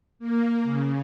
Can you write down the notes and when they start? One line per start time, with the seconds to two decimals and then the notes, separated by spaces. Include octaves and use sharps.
0.19 A#3
0.64 C#3